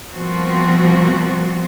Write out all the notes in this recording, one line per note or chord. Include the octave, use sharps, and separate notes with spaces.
B2 F3 G3 A#3 C4 F#4